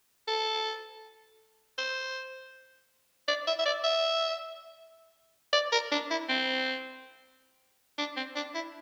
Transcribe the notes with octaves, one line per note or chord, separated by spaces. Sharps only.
A4
C5
D5
E5
E5
D5
E5
D5
A#4
D4
E4
C4
D4
C4
D4
E4